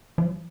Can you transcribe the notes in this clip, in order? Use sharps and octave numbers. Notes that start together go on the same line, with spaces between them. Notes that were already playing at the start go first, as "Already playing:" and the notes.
F3
F#3